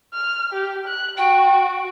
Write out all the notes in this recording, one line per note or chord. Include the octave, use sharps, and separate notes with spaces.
F6
G4
F#6
F#4 G5